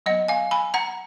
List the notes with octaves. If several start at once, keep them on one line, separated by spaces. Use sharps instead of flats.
F#3 B3 D#5 F#5
F5 G#5
G#5 B5
F#5 A#5